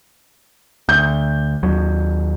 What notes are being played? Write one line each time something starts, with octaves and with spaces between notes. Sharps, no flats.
D2 G6
D#2 F#3